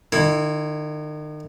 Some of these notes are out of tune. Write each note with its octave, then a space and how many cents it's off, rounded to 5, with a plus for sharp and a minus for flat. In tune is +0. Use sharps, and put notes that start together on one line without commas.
D#3 -40 E4 +0